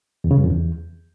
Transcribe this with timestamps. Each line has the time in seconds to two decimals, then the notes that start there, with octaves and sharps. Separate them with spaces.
0.24 E2
0.31 C#3
0.37 G2
0.44 F2
0.50 E2